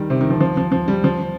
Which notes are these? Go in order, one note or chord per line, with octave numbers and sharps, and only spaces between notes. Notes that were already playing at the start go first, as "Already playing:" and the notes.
Already playing: D#3 G3
C3
D#3
F3
F3
F3
F3
G3
F3